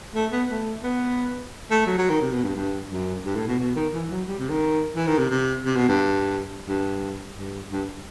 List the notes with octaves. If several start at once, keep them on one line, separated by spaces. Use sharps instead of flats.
A3
B3
A3
B3
A3
F#3
F#3
D#3
C3
B2
G2
G2
F#2
G2
A2
B2
B2
D#3
E3
F#3
G3
C3
D#3
E3
D#3
C3
C3
C3
B2
G2
G2
G2
G2